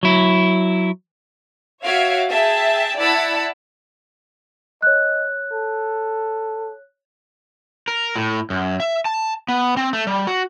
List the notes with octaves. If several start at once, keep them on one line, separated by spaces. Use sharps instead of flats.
F#3 E4
F#4 C#5 E5 F5 G#6 D7
G#4 E5 G5 A5
E4 D5 F#5 A5 B5 E6
C#5 D#5 F#6
A4
A#4
A2
F#2
E5
A5
B3
C4
A3
G3
F#4